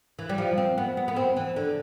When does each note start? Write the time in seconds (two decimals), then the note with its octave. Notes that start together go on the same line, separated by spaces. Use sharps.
0.19 E3
0.29 G3
0.38 F3
0.58 C4
0.78 B3
0.97 B3
1.08 B3
1.16 C4
1.37 E3
1.56 D3